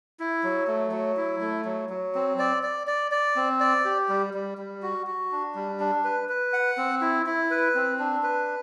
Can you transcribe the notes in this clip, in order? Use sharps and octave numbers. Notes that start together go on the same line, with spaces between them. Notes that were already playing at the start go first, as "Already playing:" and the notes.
E4
F#3
A3
F#3
E4
A3
F#3
F#3
C4
D5
D5
D5
D5
C4
D5
G4
G3
G3
G3
F#4
F#4
D4
G3
D4
B4
B4
F#5
C4
E4
E4
B4
C4
D4
B4